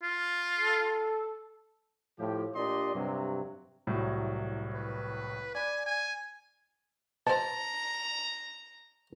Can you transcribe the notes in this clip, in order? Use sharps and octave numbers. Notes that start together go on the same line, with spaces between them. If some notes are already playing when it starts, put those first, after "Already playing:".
F4
A4
A2 F3 G4
A#2 D4 G4 D5 D#5 C6
G2 C3 F#3
C2 A2 F#3
B4
D5 G#5 B5
G#5
B2 C5 A5 A#5